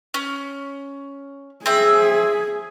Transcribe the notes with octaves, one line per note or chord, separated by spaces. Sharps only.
C#4
C4 G#4 E5